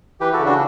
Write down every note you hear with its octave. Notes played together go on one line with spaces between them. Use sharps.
E3 G4 B4
F#4 A4
C#3
D4 F#4